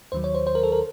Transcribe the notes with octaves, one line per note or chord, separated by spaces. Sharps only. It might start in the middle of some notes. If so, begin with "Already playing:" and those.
D#2 D#3 F#3 C5
C#5
C5
C5
A#4
A4
A#4